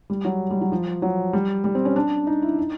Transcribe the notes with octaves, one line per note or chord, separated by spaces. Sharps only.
G3
F#3
G3
F#3
F3
F#3
G3
G3
C4
C#4
D4
D#4
E4
D#4